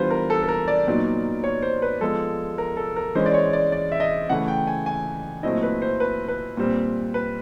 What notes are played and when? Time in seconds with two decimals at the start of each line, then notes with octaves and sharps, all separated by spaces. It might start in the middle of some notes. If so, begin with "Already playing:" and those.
Already playing: E3 G3 B3 D4 F4 B4 C5
0.11 A#4
0.30 A4
0.43 A4
0.48 A#4
0.68 D5
0.87 A#2 F#3 B3 D#4
1.44 C#5
1.62 C5
1.82 B4
2.01 F3 G#3 B3 A4
2.58 A#4
2.77 A4
2.96 A#4
3.15 E3 G#3 C#4 C5
3.26 D5
3.34 C#5
3.53 D5
3.72 D5
3.92 E5
4.00 D#5
4.29 C#3 E3 A3 F#5
4.48 G5
4.67 G#5
4.86 G#5
5.43 A#2 F#3 A3 C4 E4 D#5
5.63 B4
5.82 C5
6.00 B4
6.28 B4
6.57 A#2 G3 C4
7.14 B4